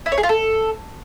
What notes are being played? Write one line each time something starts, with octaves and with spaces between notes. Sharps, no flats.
E4
C#5
G#4
F4
A4